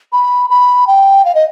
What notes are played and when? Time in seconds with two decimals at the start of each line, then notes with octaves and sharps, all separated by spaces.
0.12 B5
0.50 B5
0.87 G5
1.25 F5
1.35 D#5